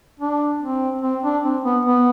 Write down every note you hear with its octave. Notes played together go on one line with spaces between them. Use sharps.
D4
C4
C4
D4
C4
B3
B3